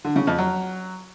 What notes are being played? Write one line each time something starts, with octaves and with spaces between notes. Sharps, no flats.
D3
C#3
F2
F#3